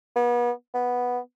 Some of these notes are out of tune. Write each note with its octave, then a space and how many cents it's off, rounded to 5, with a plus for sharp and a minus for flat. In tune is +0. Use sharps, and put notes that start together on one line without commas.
B3 -35
B3 -5